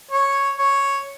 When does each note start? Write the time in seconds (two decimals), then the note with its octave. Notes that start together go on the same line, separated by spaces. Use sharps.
0.11 C#5
0.58 C#5